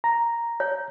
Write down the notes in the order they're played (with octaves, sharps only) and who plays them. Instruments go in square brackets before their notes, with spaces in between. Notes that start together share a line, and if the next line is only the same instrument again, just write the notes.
[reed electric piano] A#5
[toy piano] C#5